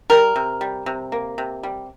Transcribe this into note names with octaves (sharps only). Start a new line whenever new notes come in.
G3 A#4
C3
G3
C3
A#3
C3
G3